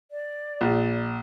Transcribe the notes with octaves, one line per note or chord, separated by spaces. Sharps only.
D5
A#1